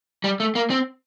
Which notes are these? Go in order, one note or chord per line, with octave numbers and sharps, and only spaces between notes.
G3
A3
A#3
C4